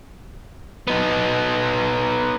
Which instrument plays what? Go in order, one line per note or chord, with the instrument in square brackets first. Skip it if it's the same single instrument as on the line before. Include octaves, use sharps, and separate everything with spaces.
[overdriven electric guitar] B3 D#4